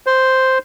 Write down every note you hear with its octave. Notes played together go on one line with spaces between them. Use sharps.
C5